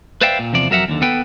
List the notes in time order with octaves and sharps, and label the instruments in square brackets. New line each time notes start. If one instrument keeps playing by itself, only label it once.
[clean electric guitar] B4 C5 D5 E5 F5 G5
A#2
E2 C3 F3 D5
F2 F#3 A#4 E5 F#5
D#2 D3
B3 A4 B4 G5